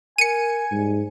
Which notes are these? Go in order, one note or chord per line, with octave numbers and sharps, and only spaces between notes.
A#4 G#5 C#7 D#7
G#2 G3